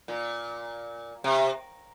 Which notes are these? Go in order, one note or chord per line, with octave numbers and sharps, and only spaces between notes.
A#2
C3